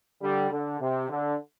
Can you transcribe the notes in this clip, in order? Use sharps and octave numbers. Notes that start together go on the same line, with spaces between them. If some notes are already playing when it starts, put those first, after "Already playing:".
D3 G3
D3
C3
D3